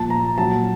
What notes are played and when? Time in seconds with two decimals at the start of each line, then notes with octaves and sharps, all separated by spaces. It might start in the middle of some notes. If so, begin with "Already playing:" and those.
Already playing: A#2 F3 A5
0.10 A#5
0.38 A#2 F#3 A5